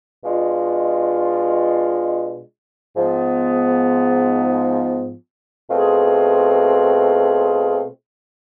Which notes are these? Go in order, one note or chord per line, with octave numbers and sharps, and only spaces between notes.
B2 G#3 D4 F4
G#2 F3 B3
B2 A3 C4 F4 G#4